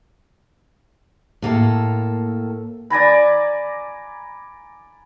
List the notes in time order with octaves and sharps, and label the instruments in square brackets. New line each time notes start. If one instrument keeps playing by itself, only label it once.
[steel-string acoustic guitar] A2 A#3 A4
[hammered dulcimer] D5 G#5 A#5 B5